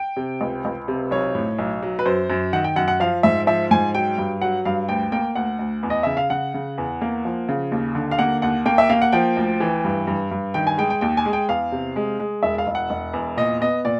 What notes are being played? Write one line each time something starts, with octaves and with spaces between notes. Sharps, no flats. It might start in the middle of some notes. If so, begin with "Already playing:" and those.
Already playing: G5
C3
C#2
C#2
C3
B1 C#5
A2
B1
F#3
B4
F#2 C5
F#2
D#3 F#5
G5
F#2 F#5
F#5
F3 F5
G#2 E5
F3 E5
G#2 G#5
F#3 G5
G2
F#3 F#5
G2 F5
D2 G5
A#3 G5
D2 F#5
D2
E2
D#5
C#3 E5
F5
C#3 F#5
C#3
E2
A#3
F3
C#3
D#2
D3
F5
A#3 F#5
D#2 F#5
A#3 G5
E5
A#3 F5
F#5
F3 G5
D2
E3
G2
G2
G2
D#3 G5
G#5
G#3 G5
G5
D#2 G5
G#5
G#3
G5
E2 F5
C3
G#3
G#3
E1 E5
F5
E1
F#5
E1
E2
A#2 D#5
B3 D#5
A#2 D5